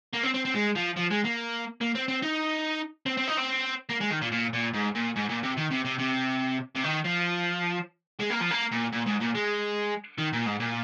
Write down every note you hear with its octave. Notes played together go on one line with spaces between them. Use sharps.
A#3
C4
C4
C4
G#3
F3
F3
G#3
A#3
A#3
C4
C4
D#4
C4
C4
D#4
C4
A#3
G#3
D#3
A#2
A#2
A#2
G#2
A#2
G#2
A#2
C3
D#3
C3
C3
C3
C3
D#3
F3
G#3
A#3
F3
A#3
A#2
A#2
G#2
A#2
G#3
D#3
A#2
G#2
A#2